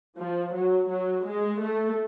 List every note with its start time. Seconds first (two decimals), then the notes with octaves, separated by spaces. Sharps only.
0.18 F3
0.53 F#3
0.89 F#3
1.25 G#3
1.60 A3